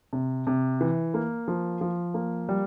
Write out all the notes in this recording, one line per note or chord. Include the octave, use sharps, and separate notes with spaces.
C3
C3
E3
A#3
F3
F3
A#3
G3